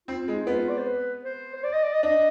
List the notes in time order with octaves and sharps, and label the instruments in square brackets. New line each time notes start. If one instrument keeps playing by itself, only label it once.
[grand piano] C4 [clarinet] F4
[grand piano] G#3
[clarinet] D#4
[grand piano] B3 [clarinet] F4
[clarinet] D5
C5
B4
C5
C5
D5
D#5
D5
D#5
[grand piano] D4 [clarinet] D#5